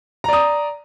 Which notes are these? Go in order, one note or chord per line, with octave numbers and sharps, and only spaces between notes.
D5 A#5 D#6